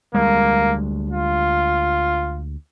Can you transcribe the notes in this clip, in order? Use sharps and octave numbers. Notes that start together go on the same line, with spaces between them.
D2 G3 G#3 A#3
F4